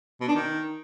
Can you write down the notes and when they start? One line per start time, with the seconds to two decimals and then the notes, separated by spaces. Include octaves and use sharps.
0.21 B2
0.28 D4
0.35 D#3